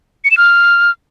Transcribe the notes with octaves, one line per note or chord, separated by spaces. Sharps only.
C#7
E7
F6